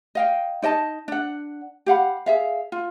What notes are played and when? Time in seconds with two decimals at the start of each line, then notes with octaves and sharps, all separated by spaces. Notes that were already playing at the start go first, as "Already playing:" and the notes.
0.15 D#5 F5 G5
0.62 D#4 D5 D#5 A5
1.08 D4 F#5
1.86 G4 F5 F#5 B5
2.26 G#4 E5 F5
2.72 F4